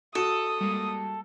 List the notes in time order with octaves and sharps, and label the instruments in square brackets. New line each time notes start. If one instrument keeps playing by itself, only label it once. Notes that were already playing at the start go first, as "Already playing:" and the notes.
[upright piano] F#4 [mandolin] A4 [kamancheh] D#6
[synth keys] G3 G#3 A#3